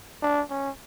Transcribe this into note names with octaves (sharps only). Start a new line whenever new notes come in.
D4
C#4